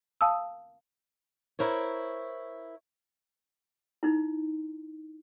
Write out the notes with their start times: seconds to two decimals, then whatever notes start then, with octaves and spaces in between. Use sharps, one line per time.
0.21 F5 A5 D#6 E6
1.59 E4 A#4 C5 C#5
4.03 D#4 E4